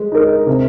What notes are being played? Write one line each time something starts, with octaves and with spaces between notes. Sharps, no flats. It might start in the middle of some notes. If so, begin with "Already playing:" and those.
Already playing: G#3
D#4 A#4
C3